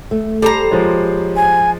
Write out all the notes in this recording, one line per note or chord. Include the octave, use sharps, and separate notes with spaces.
A3
G3 A4 C5 A#5
F3 G#3 C#5
G#5